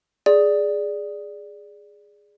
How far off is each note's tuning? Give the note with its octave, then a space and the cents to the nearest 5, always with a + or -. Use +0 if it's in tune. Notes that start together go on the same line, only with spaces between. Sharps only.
G#4 +0 D5 +0